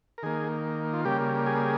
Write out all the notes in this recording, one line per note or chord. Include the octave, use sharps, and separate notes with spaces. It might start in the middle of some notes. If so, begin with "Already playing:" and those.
A#4
D#3 A#3 G#4
F4
C#3 G3 A#3 G4
G#4